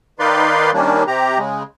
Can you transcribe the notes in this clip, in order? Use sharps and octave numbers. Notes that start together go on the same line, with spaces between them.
D#3 D#4 B4 D5 F5 C6
D#3 G3 A#3 C#4 D4
C3 G4 A#5
C#3 G#3